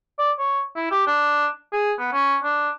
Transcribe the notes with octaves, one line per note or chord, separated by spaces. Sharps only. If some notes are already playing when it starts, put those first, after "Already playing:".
D5
C#5
E4
G4
D4
G#4
B3
C#4
D4